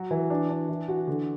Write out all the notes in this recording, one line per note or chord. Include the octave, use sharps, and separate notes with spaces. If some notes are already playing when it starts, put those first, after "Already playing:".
Already playing: F#3 F#4
E3
D4
D4
E3
F#4
D3